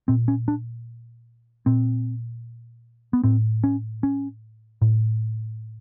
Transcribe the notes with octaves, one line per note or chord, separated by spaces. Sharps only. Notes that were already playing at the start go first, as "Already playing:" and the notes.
A#2 C4
C#4
D4
A#2 C4
B3
A2 C4
C#4
C#4
A2